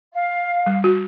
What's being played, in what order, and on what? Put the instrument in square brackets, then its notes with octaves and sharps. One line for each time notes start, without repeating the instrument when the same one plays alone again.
[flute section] F5
[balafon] G3
F#4